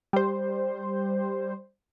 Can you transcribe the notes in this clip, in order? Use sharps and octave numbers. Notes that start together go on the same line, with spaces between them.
G3 C5